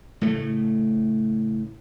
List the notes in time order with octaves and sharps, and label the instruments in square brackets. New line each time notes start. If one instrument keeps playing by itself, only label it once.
[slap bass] A2 C#3 A3